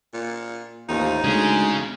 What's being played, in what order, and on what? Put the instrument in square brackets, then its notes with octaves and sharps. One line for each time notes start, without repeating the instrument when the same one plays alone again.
[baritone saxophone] A#2
[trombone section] A1 F4 C5 [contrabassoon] D#2 [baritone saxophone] D#4
[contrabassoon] D2 [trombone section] G#3 [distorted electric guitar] C#4 G#4